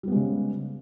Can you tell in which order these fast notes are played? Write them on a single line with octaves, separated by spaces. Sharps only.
G3 B3 G#3 C#3